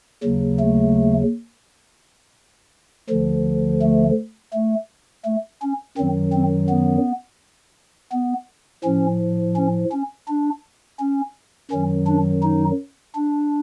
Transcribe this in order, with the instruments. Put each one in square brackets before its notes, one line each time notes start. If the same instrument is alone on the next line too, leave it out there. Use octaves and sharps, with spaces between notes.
[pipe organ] D#2 C#3 F#3
A3
D2 D3 F3
A3
A3
A3
C#4
F#2 D#3 F#3 C4
C4
B3
B3
A2 F3 C#4
C#4
C#4
D4
C#4
F#2 D#3 F#3 C#4
D4
D#4
D4